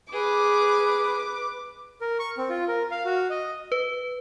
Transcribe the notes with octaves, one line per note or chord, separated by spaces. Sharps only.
G#4 B4 D6
A#4
C#6
C4
F4
A#4
F5
F#4
D#5
B4